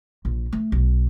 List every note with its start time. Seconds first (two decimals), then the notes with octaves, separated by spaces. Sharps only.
0.25 A#1
0.53 A3
0.72 B1